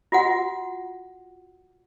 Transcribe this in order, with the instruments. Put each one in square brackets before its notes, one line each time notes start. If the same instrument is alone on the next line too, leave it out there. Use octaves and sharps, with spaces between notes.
[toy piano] F4 F#4 F#5